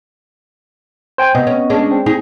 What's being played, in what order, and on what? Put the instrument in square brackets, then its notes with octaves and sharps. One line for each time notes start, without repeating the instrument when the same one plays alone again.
[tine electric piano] C5 G5 G#5
[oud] C3 [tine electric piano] B3 D#5
[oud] C#4
G#3 C#4 D4
[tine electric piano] C4
[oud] D#4 G#4